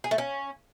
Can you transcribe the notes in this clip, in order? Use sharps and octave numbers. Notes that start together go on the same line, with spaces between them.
G#4
A3
C#4